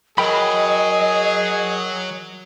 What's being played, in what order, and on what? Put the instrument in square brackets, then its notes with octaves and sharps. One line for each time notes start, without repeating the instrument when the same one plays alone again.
[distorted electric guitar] F#3 [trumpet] G#4 [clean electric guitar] A#4 G5 B5 [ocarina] D#5